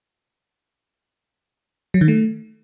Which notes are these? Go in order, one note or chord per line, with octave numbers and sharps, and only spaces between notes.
F#3
D#3
A3